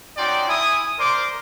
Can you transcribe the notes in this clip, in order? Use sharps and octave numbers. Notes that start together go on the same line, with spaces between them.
C#4 D#4 F#4 D5 G5 C6
E4 G#5 D#6
A#4 C5 D5 C6 D6